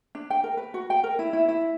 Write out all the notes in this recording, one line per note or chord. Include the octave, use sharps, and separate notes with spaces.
D4
G5
A#4
B4
F#4
G5
A#4
E4
E4
E4